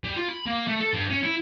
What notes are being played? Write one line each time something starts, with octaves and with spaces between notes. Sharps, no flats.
G3
F4
B5
A#3
A3
A4
G2
C#4
E4